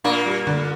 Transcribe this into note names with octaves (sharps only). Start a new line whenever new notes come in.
A#2 A#3 D4
G3
D3